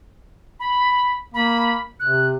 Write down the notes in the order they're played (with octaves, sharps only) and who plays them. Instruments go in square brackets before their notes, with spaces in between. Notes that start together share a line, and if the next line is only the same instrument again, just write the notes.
[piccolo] B5
[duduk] A#3 [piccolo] B5
[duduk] C3 [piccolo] F#6